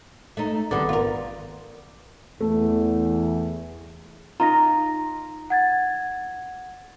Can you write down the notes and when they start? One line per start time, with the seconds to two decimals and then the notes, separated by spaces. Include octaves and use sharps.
0.37 A3 D#4
0.71 G#1 D3 G3 B3 D5
0.89 F4 A#4
2.41 E2 A3
4.40 D#4 F4 A#5 A#6
5.50 F#5 G#6 A6